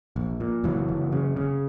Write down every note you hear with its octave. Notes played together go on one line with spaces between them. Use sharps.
A#1
A#2
F#1 E3 F#3
F#1
C#3
C#3